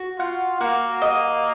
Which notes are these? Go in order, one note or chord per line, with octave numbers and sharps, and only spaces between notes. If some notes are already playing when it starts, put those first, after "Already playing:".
Already playing: F#4
F4 F#5
A#3 F#4
D#5